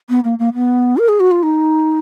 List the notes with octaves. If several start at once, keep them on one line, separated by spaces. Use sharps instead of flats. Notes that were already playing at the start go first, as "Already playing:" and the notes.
B3
A#3
A#3
B3
A#4
G#4
F#4
F4
D#4